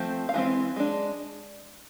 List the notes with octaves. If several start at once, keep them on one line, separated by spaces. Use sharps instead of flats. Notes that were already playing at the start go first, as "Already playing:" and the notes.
Already playing: F3 A3 C4
F5
E3 G#3 C4
G#3 D4